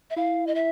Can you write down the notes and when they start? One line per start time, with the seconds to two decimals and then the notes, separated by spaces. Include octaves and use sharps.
0.10 E5
0.16 E4 F5
0.47 D#5
0.55 E5